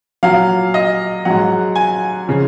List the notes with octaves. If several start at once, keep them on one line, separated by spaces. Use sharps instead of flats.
A#2 F#3 F5
D#5
G#2 F#3 F#5
G#5
C#3 F3